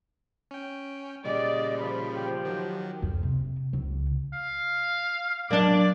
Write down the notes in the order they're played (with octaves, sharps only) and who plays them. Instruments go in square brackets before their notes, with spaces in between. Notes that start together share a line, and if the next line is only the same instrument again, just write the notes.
[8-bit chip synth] C#4 G5
[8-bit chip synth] A#2 C#3 G3 [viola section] D5 [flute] D#5
[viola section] F3 [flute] B5
[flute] G4
[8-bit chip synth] D#3 F#3
[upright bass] F2
C3
C#2
[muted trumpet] F5
[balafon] F#3 [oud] A#3 D4 [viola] D5